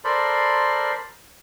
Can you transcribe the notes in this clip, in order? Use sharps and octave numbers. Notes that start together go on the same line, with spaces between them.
A4 A#4 C5 D5 B5 C6